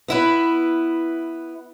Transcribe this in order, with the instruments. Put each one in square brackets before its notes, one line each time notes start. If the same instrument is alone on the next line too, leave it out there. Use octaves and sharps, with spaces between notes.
[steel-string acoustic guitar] B3 E4 B4